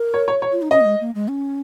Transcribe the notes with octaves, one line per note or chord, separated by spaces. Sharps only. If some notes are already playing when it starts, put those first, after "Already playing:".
Already playing: A#4
C#5
C#5
C#5
F4
D#4
C#4 D#5
A#3
G#3
A#3
G#3
C#4